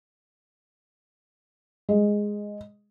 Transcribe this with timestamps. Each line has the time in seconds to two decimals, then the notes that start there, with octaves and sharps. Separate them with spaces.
1.89 G#3